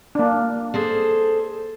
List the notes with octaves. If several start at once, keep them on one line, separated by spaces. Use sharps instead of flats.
A#3 D4
G#4 A4 C5